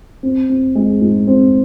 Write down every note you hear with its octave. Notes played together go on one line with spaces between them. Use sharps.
C4
C4
G#3
G#2
C4